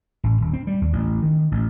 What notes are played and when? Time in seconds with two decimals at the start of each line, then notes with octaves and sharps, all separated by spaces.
0.24 A1
0.41 D#1
0.53 C4
0.67 G3
0.81 D#2
0.93 A1
1.23 D#3
1.51 A1